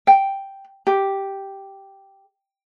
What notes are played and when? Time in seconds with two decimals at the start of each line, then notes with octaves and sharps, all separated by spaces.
0.07 G5
0.87 G4